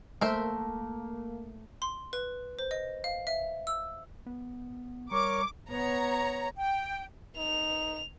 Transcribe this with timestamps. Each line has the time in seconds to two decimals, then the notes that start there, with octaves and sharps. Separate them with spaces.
0.21 A3 A#3 A#4 C5 E5
1.82 C6
2.13 B4
2.59 C5
2.71 D#5
3.04 F5
3.27 E5
3.67 E6
4.26 B3
5.11 G3 A#4 C#5 C#6 D6
5.71 B3 C#5 A#5
6.57 G5
7.38 D#4 F7